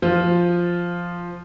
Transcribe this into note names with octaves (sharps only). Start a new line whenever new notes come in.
F3 F4